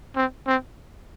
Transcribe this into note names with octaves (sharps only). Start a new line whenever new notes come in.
C4
C4